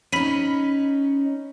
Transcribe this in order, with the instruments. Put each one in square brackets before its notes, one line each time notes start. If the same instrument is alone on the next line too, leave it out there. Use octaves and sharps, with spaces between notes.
[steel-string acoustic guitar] C#4 D#4 [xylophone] B5 B6 D#7